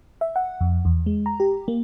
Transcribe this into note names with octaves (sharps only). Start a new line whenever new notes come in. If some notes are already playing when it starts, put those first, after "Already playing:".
E5
F#5
F2
E2
G#3
A#5
G4
A#3